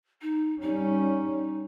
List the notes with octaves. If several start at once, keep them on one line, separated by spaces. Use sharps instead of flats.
D#4
G3 C#4 D#4